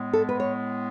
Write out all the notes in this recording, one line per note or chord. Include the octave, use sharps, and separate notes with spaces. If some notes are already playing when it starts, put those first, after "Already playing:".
Already playing: A2 G#3 B3
A4
B4
C#5